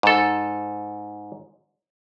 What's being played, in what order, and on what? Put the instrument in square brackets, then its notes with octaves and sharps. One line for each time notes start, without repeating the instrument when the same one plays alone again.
[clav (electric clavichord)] G#2 A4